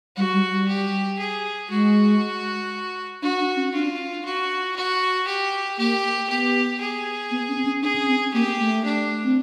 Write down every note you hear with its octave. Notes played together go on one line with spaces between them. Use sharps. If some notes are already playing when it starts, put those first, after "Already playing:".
G3 F#4
G3
G3
G4
G#4
G#3 F#4
D4 F#4
D4
C#4
D4 F4
F#4
F#4
G4
A#3 G4
B3 G4
G#4
B3
C#4
C4
C#4
D4 G#4
C#4
C4
A#3 G4
A3
D4
C4